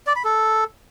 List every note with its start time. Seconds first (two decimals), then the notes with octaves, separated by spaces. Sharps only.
0.07 D5
0.16 B5
0.24 A4